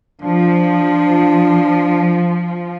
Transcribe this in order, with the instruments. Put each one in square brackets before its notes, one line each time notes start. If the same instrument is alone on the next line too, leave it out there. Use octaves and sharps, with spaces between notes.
[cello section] F3 [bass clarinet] D4